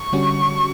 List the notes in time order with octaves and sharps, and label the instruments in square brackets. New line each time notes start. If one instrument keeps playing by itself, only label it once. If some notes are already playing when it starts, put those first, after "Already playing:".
Already playing: [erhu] C#6
[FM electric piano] D3 G3 C#4 F#4